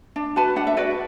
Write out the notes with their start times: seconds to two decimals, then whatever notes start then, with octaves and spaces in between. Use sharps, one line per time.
0.16 D4
0.36 F#4 B4 A5
0.56 D4 F#5
0.67 E5
0.77 F#4 B4 D5